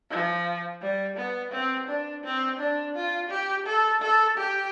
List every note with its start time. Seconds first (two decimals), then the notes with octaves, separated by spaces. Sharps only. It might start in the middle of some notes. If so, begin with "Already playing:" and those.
0.10 F3
0.82 G3
1.17 B3
1.52 C4
1.88 D4
2.24 C4
2.59 D4
2.95 F4
3.30 G4
3.66 A4
4.02 A4
4.37 G4